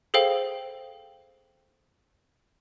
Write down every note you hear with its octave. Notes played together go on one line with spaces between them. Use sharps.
G#4 A4 C5 F5 G5